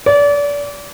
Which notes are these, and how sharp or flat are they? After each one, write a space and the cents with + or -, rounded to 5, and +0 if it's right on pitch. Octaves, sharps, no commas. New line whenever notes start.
D5 -30